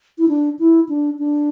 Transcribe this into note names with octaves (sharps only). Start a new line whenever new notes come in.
E4
D4
E4
D4
D4